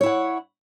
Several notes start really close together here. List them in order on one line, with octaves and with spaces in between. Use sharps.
C#5 E4 F#5